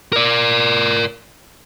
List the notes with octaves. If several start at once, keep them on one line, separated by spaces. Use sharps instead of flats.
A#4 D5